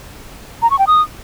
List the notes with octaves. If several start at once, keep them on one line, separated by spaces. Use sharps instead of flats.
A#5
C#6
G5
D#6